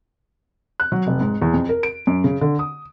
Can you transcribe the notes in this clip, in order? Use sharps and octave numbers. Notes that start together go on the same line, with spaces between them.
F#6
F#3
F1
G#2
E2
F2
A#4
D7
F#2
C#3
D3
D#6